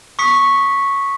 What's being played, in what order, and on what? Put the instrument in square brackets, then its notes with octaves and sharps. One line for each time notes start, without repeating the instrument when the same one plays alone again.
[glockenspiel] C#6 D#6 B6 C#7